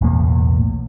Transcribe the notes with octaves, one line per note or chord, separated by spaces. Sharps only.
B1 E2 A2 A#3